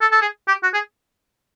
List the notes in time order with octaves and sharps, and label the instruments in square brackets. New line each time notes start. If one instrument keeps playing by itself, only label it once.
[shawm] A4
A4
G#4
G4
F#4
G#4